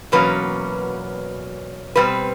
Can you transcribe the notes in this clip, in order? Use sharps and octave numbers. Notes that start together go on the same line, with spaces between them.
E2 B2 F#3 A#3 C#4 B4
B2 G3 C4 B4